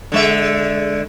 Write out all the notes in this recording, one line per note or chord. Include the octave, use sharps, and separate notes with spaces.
D3 G#3 E5